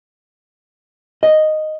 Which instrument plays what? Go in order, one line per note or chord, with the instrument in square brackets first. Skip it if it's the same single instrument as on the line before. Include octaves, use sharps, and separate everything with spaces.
[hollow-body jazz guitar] D#5